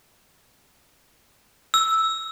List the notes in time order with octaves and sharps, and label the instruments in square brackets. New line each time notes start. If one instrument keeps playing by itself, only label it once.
[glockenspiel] E6